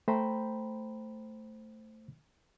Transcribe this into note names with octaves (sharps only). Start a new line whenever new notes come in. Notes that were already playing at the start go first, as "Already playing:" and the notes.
A3 C5 G5 A#5 B5